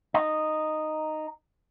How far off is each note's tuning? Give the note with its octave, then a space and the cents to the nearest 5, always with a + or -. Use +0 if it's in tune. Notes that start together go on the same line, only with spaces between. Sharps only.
D#4 -5